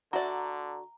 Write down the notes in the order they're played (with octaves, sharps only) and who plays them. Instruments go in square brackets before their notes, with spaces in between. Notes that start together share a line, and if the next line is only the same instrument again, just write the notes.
[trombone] D3 [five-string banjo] F#4 D5 [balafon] E5 F#5 [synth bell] A#5